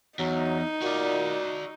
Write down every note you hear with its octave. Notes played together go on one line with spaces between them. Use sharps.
E2 F#3 D#4
A#2 F#4 D5